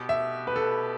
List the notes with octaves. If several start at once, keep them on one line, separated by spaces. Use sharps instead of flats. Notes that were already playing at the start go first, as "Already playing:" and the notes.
Already playing: B2 B3 G4
E5
B4
A4